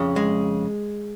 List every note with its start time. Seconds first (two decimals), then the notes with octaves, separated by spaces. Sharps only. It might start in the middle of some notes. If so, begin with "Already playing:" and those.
Already playing: F2 C#3
0.16 G#3